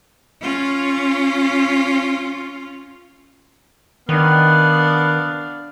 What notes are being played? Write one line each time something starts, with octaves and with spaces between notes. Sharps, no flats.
C#4 F4
D#3 B3 D4 F5